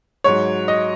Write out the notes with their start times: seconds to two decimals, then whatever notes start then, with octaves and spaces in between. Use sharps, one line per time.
0.24 G#2 F#3 C#5
0.68 D#5